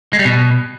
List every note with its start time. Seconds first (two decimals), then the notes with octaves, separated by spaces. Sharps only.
0.13 G#3
0.19 G3
0.25 B2